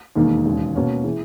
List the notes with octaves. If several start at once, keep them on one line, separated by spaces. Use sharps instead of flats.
E1 D#2 D#3 A#3
E1 D#2 C#3 G#3
B2 A#3 C#4
E3 G#3